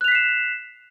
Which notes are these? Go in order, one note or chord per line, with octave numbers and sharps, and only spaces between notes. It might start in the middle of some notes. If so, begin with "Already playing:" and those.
F#6 B6 C7 E7 F7